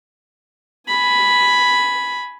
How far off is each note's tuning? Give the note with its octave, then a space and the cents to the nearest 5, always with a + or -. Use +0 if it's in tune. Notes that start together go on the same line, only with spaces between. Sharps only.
G#5 +15 B5 +0